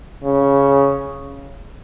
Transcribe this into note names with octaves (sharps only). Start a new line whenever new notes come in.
C#3